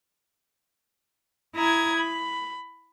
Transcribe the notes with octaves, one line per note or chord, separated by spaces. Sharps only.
E4 A#5 D#6 G#6
B5